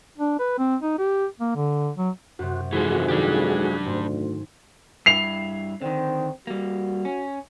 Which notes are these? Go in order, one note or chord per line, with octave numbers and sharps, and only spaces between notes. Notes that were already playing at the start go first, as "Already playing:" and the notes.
D4
B4
C4
D#4
G4
A#3
D3
F#3
F#2 C3 F#4
G#1 F2 G#2 E3 F#4 G#4 C5
D#3 F#3 D4 G4
D2 G#2
G2 E4 C7 F7
D3 D#3 C4
G3 A#3 F#4
C#4